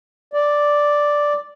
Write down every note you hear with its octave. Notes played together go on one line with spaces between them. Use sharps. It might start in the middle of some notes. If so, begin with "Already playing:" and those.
D5